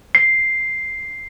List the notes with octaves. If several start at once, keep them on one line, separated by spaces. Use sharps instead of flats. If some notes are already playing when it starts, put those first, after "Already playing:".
C7